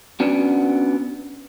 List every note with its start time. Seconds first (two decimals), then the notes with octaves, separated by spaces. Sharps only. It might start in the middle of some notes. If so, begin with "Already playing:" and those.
0.20 B3 C#4 D4 F#4